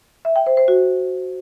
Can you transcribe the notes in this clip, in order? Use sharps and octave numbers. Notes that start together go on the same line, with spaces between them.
E5
G5
C5
C5
F#4